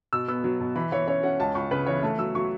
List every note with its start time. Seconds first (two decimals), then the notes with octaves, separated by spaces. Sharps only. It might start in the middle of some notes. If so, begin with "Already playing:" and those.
0.13 B2 E6
0.28 B3 E6
0.44 F#3
0.60 B2
0.75 E3 B5
0.92 E3 C#5
1.08 C#4 C#5
1.23 C#4 F#5
1.40 C#2 A5
1.55 C#2 C#6
1.71 C#3 B4
1.87 E3 C#5
2.03 A3 A5
2.18 F#3 E6
2.35 F#3 C#6